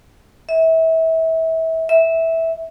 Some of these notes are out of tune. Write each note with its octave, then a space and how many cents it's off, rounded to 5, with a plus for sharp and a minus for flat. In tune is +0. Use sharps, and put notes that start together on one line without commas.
E5 -30
E5 -10